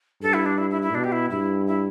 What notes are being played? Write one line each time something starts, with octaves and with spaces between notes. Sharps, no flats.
G2 A4
E4
D4
E4
E4
E4
B2 D4
G4
E4
G2 E4
E4